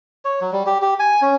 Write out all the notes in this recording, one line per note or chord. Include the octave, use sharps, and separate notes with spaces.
C#5
F#3
G3
G4
G4
G#5
C#4